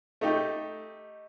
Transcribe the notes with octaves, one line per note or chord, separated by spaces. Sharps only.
A3 D#4 G4